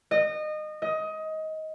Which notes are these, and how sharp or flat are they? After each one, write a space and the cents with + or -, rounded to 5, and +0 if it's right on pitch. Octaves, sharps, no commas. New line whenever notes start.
D#5 -25
D#5 +20